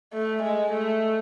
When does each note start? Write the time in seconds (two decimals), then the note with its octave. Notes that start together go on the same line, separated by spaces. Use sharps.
0.13 A3
0.43 G#3
0.73 A3